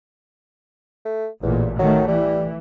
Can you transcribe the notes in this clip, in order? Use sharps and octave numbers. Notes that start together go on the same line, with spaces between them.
A3
A1 E2 A#2
D#3 F#3 A3
E3 G3